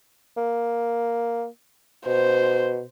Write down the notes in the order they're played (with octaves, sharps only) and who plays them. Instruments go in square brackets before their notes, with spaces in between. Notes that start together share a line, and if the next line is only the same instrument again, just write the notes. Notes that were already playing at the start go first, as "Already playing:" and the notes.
[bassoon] A#3
[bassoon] B2 [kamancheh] C5